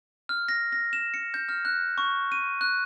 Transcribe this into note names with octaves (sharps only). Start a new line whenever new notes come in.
F6
A#6
A#6
E7
C#7
G6
F6
F#6
C#6
D#7
F#6